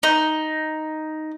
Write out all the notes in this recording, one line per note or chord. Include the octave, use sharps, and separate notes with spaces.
D#4